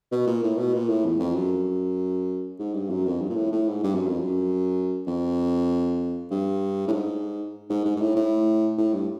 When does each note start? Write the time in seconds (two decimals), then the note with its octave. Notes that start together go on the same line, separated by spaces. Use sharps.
0.11 B2
0.27 A#2
0.43 A2
0.58 B2
0.74 A#2
0.89 A2
1.05 E2
1.20 F2
1.35 F#2
2.59 G#2
2.74 G2
2.90 F#2
3.06 F2
3.21 G2
3.29 A#2
3.36 A2
3.52 A2
3.68 G#2
3.83 G2
3.95 F#2
4.07 F2
4.19 F#2
5.07 F2
6.31 G2
6.88 A2
6.92 G#2
7.70 G#2
7.85 G#2
7.96 G#2
8.01 A2
8.16 A2
8.78 A2
8.93 G2